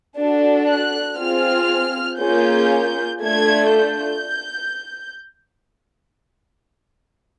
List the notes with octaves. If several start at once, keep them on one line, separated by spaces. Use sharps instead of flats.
D4 F#4 A4
F#6
C4 F4 G#4 F6
A#3 C#4 F4 G#4 G6
A3 D4 F4 A4 G#6
G6